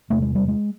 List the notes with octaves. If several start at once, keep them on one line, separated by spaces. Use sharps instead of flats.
E2 C3 A3
G#3
G3
G#3